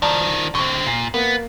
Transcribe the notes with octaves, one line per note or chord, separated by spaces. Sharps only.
D#3 F3 D5 A5 A#5
D3 C4 C#6
A#2 C7
A#3 B3